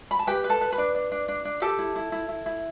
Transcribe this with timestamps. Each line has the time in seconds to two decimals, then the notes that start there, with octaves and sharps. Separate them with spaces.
0.11 B5
0.19 A5
0.27 G4 B4 G5
0.44 B4
0.50 A4 A5
0.61 B4
0.72 B4 B5
0.78 D4
0.95 D4
1.12 D4
1.28 D4
1.45 D4
1.62 G4 A4 A5
1.79 E4
1.96 E4
2.12 E4
2.29 E4
2.46 E4